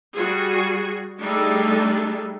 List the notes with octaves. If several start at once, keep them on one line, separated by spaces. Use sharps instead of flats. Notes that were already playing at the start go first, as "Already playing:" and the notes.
G3 F#4 G#4
G3 A3 D4 D#4 G#4 A4